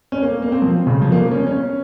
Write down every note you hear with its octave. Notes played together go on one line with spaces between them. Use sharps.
C#4
A#3
A#3
C4
F3
C#3
F3
A#3
C#4
C#4